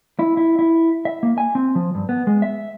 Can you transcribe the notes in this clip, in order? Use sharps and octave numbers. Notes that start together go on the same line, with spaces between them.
E4
E4
E4
E5
A#3
G#5
C4
F3
G2
B3
G#3
E5